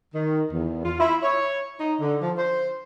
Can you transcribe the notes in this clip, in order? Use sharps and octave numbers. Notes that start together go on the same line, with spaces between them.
D#3
E2
F4
E4
C#5
D#4
D3
F3
C5